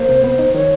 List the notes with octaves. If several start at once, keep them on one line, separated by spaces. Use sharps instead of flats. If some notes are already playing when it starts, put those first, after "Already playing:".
Already playing: A#3 C5
C3
B3
D#4
D#3 C#5